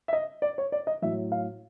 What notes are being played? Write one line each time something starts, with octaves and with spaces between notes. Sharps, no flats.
E5
D#5
D5
C#5
D5
D#5
A2 F#3 E5
F5